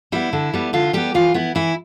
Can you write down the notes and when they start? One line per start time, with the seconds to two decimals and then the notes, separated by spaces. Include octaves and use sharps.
0.12 G3 B3 E4
0.33 D3
0.54 G3 B3
0.73 D3 F4
0.93 G3 B3 G4
1.14 E3 F4
1.34 B3 E4
1.55 E3 E4